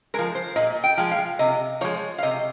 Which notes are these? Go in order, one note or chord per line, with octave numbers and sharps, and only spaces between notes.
F3 G#3 A#4
C5
A#2 D#5
G5
F3 G#3
F5
C3 D#5
F3 G#3 C#5
F5
C3 D#5